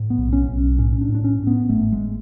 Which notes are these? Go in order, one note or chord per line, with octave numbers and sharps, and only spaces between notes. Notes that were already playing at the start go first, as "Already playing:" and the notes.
Already playing: A2
B3
B1
C#4
B1
A2 C#4
D4
A2
D4
C#4
A2
B3
G#1 A3
G#3